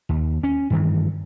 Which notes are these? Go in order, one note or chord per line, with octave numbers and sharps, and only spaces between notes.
D#2
C#4
G2 D#3 E3